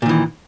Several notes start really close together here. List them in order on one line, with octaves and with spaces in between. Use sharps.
A#2 D#3 E3